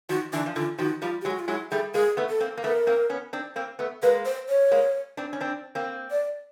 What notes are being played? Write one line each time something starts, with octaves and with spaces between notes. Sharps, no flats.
D#3 F3 F#4
D3 E3 D4
F3
D3 E3 F4
D#3 F3 F#4
F3 G3 F4
F#3 G#3 G4
F#4
F4
F#3 G#3 E4
G3 A3 G#4
G#3 A#3 G#4
A3 B3
A4
A#3 C4
A#3
A3 B3 A#4
A#3 C4
B3 C#4
C4 D4
A#3 C4
A3 B3
G#3 A#3 B4
C5
C#5
G#3 A#3
C4 D4
C#4
C4 D4
A#3 C4
D5